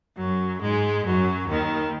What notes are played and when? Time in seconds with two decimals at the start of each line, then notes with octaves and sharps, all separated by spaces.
0.17 F#2 F#3
0.61 G#2 G#3
1.05 F#2 F#3
1.48 D#2 D#3